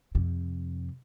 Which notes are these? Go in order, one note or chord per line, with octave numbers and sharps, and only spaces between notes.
F2 C3